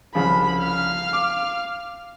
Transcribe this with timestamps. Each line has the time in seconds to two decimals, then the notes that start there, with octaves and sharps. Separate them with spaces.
0.15 C2 C#3 F3 B5
0.60 F5 F6
1.13 D6